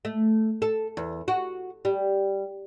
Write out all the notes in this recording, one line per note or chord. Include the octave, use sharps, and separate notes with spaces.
A3
A4
E2
F#4
G3